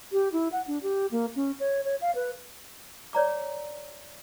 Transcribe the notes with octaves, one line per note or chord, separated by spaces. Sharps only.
G4
E4
F#5
D4
G4
A#3
C#4
C#5
C#5
F5
B4
C#5 D5 A#5 D6